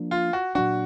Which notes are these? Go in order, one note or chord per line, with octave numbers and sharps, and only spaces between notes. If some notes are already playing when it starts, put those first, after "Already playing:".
Already playing: F3 A#3 D4
F4
F#4
A#2 F#3 D4 F#4